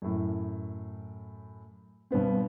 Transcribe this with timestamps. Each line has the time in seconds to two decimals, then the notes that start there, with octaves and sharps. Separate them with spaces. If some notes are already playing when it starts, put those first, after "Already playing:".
0.02 F#2 A2
2.11 G2 B2 B3 C4